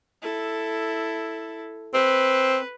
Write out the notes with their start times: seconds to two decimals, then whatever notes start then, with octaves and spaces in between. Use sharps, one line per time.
0.21 E4 A4
1.94 C4 B4